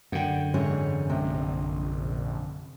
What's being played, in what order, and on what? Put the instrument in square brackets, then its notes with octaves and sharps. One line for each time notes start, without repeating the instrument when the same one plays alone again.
[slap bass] F#2 D3 [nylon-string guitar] F#5 G5
[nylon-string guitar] G#2 C3 E3 [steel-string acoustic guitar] G#3 C#4 C#5
[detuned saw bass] A#1 [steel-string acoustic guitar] C3 D#5 [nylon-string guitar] G5